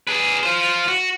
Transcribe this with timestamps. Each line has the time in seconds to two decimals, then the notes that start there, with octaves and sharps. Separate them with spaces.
0.07 G#4 B4
0.43 F4 C5
0.88 F#4